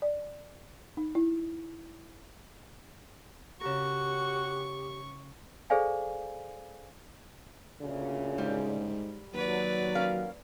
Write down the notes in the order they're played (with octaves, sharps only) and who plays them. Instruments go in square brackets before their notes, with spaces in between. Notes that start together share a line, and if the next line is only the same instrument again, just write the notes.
[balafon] D5
D#4
E4
[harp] C#3 A#4 [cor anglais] F#4 [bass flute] G4 [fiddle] C#6
[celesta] G#4 A4 C5 D5 F5 G#5
[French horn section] D2 A#2 C#3
[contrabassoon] G#2 [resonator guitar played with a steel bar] G3
[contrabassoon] D#2 [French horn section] F#3 [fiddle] B4 D5
[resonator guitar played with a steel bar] C#4 A#4 F5